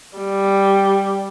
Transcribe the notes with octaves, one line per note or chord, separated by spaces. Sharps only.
G3